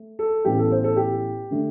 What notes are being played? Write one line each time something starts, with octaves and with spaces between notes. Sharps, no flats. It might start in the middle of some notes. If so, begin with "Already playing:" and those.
Already playing: A3
A4
A1 A2 E3 B3 G4
A4
C5
A4
G4
D3 A3 D4